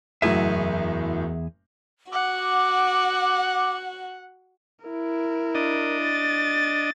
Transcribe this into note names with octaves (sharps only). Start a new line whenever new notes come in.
F#1 E2 A2 F#3 G#4 E5
F#4 F#5 D6
E4 A#4
D4 D#5
A6